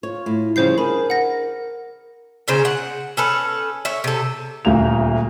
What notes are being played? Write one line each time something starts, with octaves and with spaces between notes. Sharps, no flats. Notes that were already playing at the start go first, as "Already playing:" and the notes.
F4 C#5
A2
C#3 F3 G3 C5 G6 C7
D4 G#4 A#4 B5
F#5 A#6
A#2 C#3 C5
F#5
C#4 A4 B4
C#5 E5
C3 A4
D#1 D2 A#3 F7